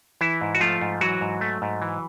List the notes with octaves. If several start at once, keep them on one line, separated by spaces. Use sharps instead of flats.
E3 E4
G#2
F#4
F3 A3 F4
G#2
E3 F#3 F#4
G#2
A3
G#2
E3